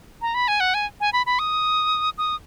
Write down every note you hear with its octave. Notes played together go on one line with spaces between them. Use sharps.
A#5
B5
G#5
F#5
G#5
G#5
B5
B5
D#6
D#6